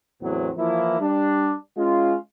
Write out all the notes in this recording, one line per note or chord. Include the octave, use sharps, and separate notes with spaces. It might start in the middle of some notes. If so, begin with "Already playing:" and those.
E2 A2 F#3 B3 C4
E3 F3 A#3 E4
G3 D4
G#3 C#4 F4